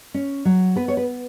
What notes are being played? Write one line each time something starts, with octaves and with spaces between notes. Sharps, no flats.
C#4
F#3
B3 B4
C#5
B4